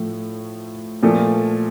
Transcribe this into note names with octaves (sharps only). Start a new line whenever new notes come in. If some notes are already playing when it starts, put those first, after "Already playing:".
Already playing: A2 F3 A3
A#2 F3 A3